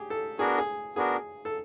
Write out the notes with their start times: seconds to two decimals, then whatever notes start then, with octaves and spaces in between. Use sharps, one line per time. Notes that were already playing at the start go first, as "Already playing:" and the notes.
Already playing: G4 G#4
0.10 A4
0.39 B3 D4 F#4 G#4 A#4
0.58 G#4
0.96 B3 D4 F#4 G#4 A#4
1.45 A4